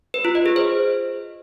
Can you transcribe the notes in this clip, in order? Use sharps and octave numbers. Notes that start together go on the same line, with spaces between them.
B4
F4
D#5
G#4
C5